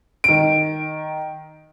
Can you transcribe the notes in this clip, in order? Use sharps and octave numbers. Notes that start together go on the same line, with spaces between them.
D#3 D7